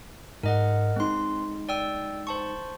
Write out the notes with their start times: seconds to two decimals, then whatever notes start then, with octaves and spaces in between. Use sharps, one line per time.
0.43 G#2 A#4 D#5 F#5
0.96 G#3 C4 D#4 C6
1.69 D5 G5 E6
2.27 C5 A5 C#6